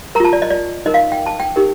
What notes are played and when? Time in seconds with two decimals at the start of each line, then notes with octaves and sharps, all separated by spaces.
0.15 A#4 A#5
0.20 F4 A5
0.33 D5
0.42 D#5
0.50 D5
0.86 D#4 A#4 D#5
0.94 F5
1.12 G5
1.26 A5
1.40 G5
1.56 D#4 G4 A#4